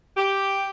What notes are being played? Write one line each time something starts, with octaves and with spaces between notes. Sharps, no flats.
G4